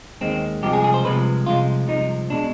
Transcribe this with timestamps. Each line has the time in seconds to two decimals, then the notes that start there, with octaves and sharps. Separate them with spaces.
0.21 D#2 D#3 G#3 C4
0.62 C2 C3 F3 G#3 G4
0.73 G#4
0.84 G#4
0.94 C5
1.05 C2 C3 F3 G#3 B4
1.46 C2 C3 F3 G#3 F4
1.88 C2 C3 F3 G#3 D#4
2.30 B2 G#3 D4